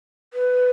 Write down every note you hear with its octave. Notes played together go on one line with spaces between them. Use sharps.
B4